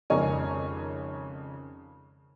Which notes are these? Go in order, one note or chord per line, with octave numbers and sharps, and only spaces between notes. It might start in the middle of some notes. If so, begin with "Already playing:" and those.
G#1 F2 C#3 A#4 C#5 G#5